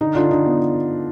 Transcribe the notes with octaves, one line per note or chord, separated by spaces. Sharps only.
D3 D#4
D3 D4 F4
D3 D#4
B3